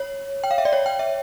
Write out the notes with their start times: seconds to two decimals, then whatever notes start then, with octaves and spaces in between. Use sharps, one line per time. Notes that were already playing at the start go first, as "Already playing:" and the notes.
Already playing: C#5
0.44 G5
0.51 F5
0.58 E5
0.65 D5
0.73 C#5
0.86 G5
0.99 E5